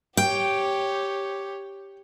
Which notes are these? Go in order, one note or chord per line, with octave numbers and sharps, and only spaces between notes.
G4 C#5 G5